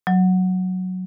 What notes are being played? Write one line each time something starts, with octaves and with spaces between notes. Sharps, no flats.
F#3